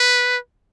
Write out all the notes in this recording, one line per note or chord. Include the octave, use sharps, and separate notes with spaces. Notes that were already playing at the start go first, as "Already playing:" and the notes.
Already playing: B4